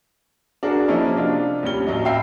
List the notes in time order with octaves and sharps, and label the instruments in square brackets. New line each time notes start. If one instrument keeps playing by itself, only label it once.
[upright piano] D4 F#4 G#4 A#4
F3 F#3 A#3 C#4 D#4 E4
C3 D4 F4
D#2 G3 C#4 G7
A1 F#3 D#5
E5 F5 G5 B5 C7